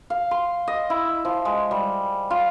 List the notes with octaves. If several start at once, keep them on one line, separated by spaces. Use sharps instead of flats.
F5
C6
D#5
E4
F3
G#3
G3
F4